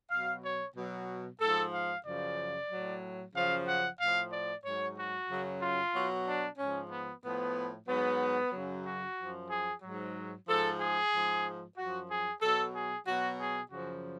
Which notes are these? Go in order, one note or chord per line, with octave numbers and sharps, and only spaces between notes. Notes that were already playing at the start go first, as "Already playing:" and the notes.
B2 F#3 F5
C#5
B2 F#3
G#2 F3 A4
F5
F#2 C#3 F3 D5
A2 F#3
F#2 C#3 F3 F5
F#5
A2 F3 F5
D5
G#2 F#3 C#5
F#4
F#2 C#3 F#3
F4
B2 F#3
D4
G#2 F3 C#4
B3
A2 F3 B3
G#2 F#3 B3
F#2 C#3 F#3
F#4
F#2 F3
G#4
G#2 F#3
G#2 F3 A4
G#4
G#2 F3
F#2 F3 F#4
G#4
B2 F#3 A4
G#4
B2 F#3 F#4
G#4
F#2 C#3 F3 F#4